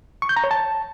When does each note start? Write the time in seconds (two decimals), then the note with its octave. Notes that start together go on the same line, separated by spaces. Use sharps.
0.22 C#6
0.29 G6
0.36 A#5
0.44 C#5
0.51 A5